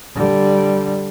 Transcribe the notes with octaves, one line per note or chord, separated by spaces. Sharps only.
D3 G3